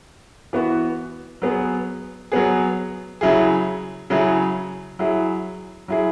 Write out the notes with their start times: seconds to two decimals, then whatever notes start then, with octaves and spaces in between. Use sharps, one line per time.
0.53 E3 B3 F#4
1.42 F#3 B3 G#4
2.32 F#3 B3 G#4
3.21 C#3 F#3 E4 G#4
4.10 C#3 F#3 E4 G#4
4.99 F#3 E4 G#4
5.88 F#3 E4 G#4